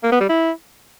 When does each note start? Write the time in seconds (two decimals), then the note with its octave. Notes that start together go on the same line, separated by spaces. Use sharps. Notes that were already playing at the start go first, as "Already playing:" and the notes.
0.03 A#3
0.12 B3
0.21 G3
0.29 E4